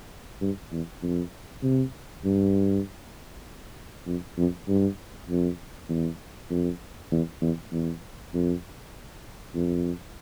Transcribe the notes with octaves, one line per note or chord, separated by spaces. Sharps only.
G2
E2
F2
C3
G2
F2
F2
G2
F2
E2
F2
E2
E2
E2
F2
F2